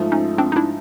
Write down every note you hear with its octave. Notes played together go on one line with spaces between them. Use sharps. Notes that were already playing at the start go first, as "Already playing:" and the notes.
Already playing: G#2 F3 A3
C#4 D#4
C4 D4
D#4
D4 E4